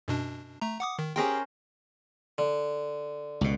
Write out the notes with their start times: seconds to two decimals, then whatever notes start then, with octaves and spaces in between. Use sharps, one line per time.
0.08 F#2 B2 D4
0.62 A3 A#5
0.80 F#5 D6 D#6
0.99 D#3
1.16 C#4 G4 G#4 A#4 C5 G5
2.38 D3
3.41 C#2 B2